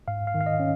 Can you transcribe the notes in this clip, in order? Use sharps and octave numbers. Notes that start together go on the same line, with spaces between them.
G#2 F5
F5
D#3
F5
D#5
C#4